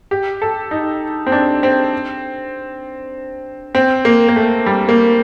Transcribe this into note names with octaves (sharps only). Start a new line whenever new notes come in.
G4
A4
D#4
C4
D4
C4
C4
A#3
A#3
A3
G3
A#3